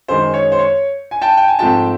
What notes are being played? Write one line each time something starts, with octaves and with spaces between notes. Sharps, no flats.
F#2 D#3 G#3 C5
C#5
C5
C#5
G#5
G5 A5
G5
G#5
G#2 F3 A3 C4 G5 A5